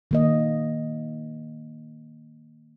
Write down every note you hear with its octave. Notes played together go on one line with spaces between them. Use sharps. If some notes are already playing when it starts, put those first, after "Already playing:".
D#3 A#3 D#5